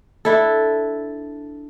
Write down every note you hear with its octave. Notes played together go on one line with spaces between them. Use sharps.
D4 E4 A4